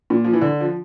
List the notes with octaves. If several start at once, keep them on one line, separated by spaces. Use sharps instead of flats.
A#2
F3
E3
D3
F3